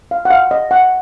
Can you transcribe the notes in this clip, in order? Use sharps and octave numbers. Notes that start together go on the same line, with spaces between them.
F5
F#5
F5
D#5
F#5